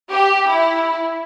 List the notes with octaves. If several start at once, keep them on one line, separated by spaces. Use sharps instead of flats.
G4
E4